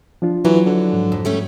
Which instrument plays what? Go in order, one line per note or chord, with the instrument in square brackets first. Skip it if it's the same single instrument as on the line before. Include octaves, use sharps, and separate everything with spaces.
[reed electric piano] F3 D4 F4
[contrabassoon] E3 [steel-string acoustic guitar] F#3
[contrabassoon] D3
[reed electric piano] G#2 F3
[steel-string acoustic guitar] F2
G3 A3 C#4